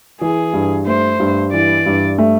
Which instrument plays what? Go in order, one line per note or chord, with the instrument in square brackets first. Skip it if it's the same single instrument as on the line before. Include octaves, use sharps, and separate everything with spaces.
[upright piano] E3 [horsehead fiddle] G#4
[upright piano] G2
[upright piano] A3 [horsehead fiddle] C5
[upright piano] G2
[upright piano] E3 [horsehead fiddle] D5
[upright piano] G2
A3